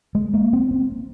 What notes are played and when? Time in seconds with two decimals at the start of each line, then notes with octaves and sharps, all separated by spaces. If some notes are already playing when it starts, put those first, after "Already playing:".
0.15 G#3
0.33 A#3
0.53 C4
0.71 C4